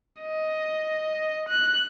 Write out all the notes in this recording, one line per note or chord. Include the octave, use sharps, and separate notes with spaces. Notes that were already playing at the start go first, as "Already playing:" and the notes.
D#5
F#6